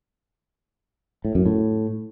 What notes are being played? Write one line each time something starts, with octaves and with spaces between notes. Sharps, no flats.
A2
F#2
A2